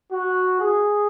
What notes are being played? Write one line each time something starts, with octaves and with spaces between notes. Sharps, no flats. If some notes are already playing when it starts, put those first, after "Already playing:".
F#4
G#4